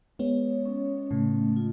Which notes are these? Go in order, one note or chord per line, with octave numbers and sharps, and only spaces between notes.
G#3 B3 C#5
C#4
A2 C#3 A3
F4